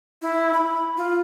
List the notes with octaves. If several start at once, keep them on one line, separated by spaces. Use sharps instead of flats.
E4
B5
F4